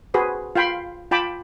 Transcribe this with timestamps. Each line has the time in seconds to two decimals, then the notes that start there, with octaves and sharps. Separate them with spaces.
0.14 F#4 G#4 B4 C5
0.56 F4 F5 G5 B5 C6
1.11 F4 G5 A5 B5 D6